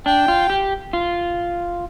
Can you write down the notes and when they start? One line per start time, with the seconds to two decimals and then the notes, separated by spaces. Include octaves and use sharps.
0.06 D4 G5
0.28 F4
0.50 G4
0.93 F4